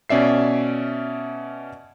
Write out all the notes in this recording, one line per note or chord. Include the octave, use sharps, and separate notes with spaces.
B2 C#4 D5 E5 C7